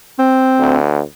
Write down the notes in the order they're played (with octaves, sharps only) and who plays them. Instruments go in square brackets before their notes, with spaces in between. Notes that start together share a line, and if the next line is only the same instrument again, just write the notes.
[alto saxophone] C4
[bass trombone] D2